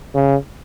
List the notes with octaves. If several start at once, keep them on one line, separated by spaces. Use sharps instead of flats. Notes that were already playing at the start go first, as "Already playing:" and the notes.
C#3